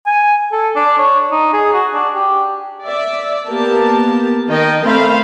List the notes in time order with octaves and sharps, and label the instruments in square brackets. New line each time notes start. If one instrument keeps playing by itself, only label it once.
[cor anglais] G#5
A4
D4
C#5
D#4
G#4
F#4
D4
G4
[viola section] D5 E5
A#3 B3 G4 A#4 A5
D#3 D#5 G5
A3 C4 C5 F5 B5